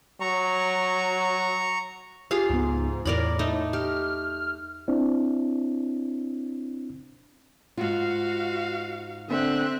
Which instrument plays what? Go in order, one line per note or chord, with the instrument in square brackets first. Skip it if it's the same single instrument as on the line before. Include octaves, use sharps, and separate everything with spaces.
[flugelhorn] F#3 [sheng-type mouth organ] A#5 C#6
[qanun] F4 G#4 F5 [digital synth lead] G4
[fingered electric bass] C#2 B3 [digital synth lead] G#2
[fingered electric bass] E2 [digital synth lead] A2 [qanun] A#4 D5 B5
[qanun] A3 D#4
[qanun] G4 [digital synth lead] F6
[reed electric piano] C4 D4 E4
[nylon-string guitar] G#2 F4 [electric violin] F#4 F5
[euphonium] D3 [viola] C4 [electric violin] E5 F#6